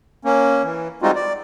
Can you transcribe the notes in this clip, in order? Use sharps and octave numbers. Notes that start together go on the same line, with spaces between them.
A#3 C#4
E3
G3 G#3 C4 D#4 F4 F#4
D5